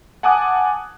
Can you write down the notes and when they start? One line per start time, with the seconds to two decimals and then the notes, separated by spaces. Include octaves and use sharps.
0.23 F#5 G#5 A5 D6 D#6 F#6